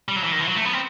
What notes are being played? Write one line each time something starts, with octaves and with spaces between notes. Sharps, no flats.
G3
F#3
E3
D#3
E3
F#3
A3
B3
C4